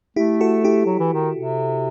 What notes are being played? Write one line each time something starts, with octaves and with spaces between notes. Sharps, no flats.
A3 E4 G4
F#4 A4
E4 G4
F#3
E3
D#3
C3